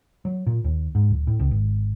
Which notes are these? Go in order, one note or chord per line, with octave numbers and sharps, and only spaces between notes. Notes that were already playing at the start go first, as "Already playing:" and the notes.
F#3
A#2
D#2
G#2
D1
A2
C#2
G#1